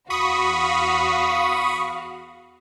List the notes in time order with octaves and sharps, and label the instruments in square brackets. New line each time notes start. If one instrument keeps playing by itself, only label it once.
[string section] E2 F#4 F5 [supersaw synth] B5 C#6 D#6